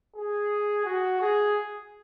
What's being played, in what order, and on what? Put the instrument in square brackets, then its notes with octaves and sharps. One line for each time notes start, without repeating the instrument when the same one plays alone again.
[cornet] G#4
F#4
G#4